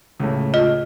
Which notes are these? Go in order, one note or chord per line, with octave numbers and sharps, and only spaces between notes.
C#2 A2
F4 D#5